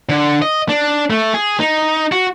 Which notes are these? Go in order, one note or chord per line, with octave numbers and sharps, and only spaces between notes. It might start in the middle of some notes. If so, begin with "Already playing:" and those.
D3
D#5
D4
A3
G#4
D#4
F#4